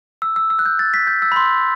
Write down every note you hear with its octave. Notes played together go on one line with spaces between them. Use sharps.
E6
E6
E6
F#6
G6
A6
B6
G6
E6
B5
C6